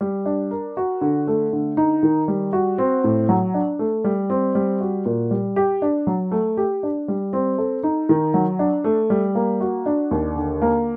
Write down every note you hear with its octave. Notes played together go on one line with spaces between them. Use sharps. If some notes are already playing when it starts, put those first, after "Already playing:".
G3
D4
A#4
F#4
D3
A3
D3
D#4
D#3
G3
F#4
C4
A2
F#3
D4
A3
G3
C4
G3
F#4
A#2
G3
G4
D4
F#3
A3
G4
D4
G3
C4
A4
D#4
D#3
F#3
D4
A3
G3
A#3
F#4
D4
D#2
D3
A#3